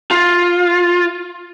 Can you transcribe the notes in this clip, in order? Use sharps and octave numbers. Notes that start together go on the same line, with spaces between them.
F4